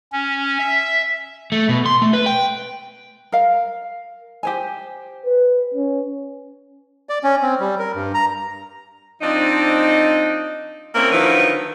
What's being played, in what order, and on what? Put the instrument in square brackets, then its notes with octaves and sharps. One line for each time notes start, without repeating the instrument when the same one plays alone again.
[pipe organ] C#4
E5
[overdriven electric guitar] A3
B2
C6
A3
B4
G5
[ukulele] A#4 F5
G4 C5 G#5
[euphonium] B4
C#4
[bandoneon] D5
C#4
C4
G3
A#4
G2
A#5
[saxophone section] F3 C4 D4 D#4
A#3 C4 C#4 E4 A#4
D3 D#3 F3 F#3 E4 B4